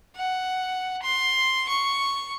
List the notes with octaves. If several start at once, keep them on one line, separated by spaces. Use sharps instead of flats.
F#5
C6
C#6